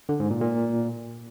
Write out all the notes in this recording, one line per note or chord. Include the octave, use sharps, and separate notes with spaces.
D3
G#2
A#2
A#2